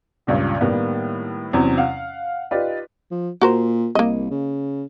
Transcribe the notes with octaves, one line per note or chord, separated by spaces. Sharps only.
C#2 G2 A#2 C#3
A2 D#3 G3 A#3 B3
E2 C3 F#3 C4 C#4
F5 F#5
D#4 F4 G4 B4 D5
F3
A#2 F#4 A#4 C5
C2 A#3 D#5
C#3